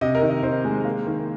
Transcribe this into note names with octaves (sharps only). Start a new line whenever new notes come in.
C3 D#5
A#4
D#3
D#5
D#3 C5
G#3
A#3
D#3